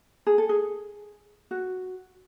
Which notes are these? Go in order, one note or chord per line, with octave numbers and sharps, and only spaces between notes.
G#4
A4
G#4
F#4